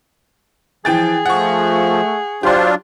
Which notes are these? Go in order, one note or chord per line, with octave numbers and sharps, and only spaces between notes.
E3 F3 G#4 G5 A6
F3 A3 F#5 C#6
F#3 D4 F4 G4 C5 C6